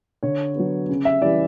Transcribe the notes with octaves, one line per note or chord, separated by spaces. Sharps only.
D3 C#5
F#3 B3
C#3
E5
E3 G3 D5